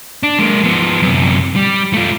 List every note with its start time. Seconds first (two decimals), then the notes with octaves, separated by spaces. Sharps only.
0.23 D4
0.39 G#3 A#3
0.64 F3 B3
1.02 F#2 C3
1.56 G3
1.94 A3 F4